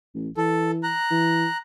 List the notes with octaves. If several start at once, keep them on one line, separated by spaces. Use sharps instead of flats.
A1
E3 A4
A#5 F#6
E3